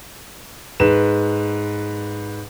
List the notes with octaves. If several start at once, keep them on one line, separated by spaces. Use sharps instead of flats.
G#2 B4 E7